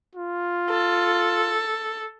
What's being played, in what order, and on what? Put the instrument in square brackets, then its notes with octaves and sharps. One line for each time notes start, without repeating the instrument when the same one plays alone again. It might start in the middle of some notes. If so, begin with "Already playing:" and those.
[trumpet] F4
[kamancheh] A4